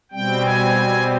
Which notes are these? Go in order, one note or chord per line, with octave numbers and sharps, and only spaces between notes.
B2 G3 C4 G5
G#5